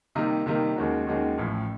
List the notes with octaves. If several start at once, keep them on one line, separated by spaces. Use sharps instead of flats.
C3 D#3 G3 A#3 D#4
C3 D#3 G3 A#3 D#4
D#2 D#3 G#3 C#4 F#4
D#2 D#3 G#3 C#4 F#4
A1 A2 F3